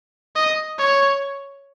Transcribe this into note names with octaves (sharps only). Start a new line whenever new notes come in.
D#5
C#5